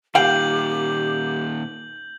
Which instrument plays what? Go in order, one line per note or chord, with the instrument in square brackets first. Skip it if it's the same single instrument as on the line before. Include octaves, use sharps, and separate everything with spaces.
[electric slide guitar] A#2 D#3 [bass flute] G4 [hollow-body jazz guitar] F5 G5 [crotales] G6 F#7